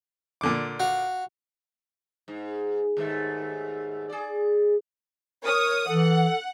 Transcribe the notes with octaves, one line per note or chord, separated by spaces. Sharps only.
A#2 D3 D6
F#4 F5
G#2
D#2 G#2 A3
G#4 D5
A#4 C#5 D#6
E3 A4 F#5